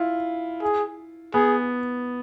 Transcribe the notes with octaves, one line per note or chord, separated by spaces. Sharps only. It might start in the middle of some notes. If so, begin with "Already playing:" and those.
Already playing: E4 F4
G#4
B3 G#4